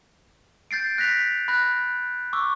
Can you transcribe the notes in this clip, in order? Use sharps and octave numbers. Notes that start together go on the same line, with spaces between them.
G6 A6 C7 D7
F#6 A#6 B6 F7
B5 F#6 A#6
C#6 D6 E6